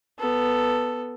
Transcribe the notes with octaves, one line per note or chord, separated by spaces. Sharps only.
B3 A4